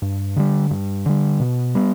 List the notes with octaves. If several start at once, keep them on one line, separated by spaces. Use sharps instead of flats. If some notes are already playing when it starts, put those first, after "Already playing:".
G2
D3 G3
G2
D3 G3
B2
G3 B3